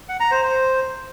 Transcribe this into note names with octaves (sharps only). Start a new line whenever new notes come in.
F#5
A#5
C5
C5